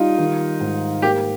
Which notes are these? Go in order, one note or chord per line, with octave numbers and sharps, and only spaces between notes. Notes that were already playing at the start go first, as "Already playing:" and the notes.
Already playing: G3 D#4 F4
D#3
G#2
A#3 G4